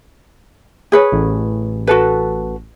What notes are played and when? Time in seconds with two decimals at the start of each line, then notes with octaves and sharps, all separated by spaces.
0.92 G#4 B4 C#5
1.12 A1
1.87 F#4 A4 B4